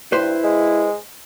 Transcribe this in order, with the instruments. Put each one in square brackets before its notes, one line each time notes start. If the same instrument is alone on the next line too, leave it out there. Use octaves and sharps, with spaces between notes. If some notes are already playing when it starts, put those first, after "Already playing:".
[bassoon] G2 [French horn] E4 [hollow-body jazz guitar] B4 C5
[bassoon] G#3